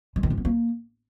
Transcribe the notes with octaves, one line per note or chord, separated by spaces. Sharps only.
G#3
D#3
G#2
B3
A#3